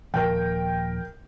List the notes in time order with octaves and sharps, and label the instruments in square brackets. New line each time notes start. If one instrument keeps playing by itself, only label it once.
[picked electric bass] D#1 A#2 F3 [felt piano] A#4 G5